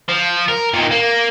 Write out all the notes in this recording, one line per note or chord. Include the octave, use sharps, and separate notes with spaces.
F3
A#4
A#2 D#3
A#3